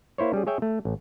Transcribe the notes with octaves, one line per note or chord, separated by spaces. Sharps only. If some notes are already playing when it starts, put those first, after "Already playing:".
A#3 E4 C5 C#5
G3 C#4 G#4
G#4 C#5 E5 G5
A3
A1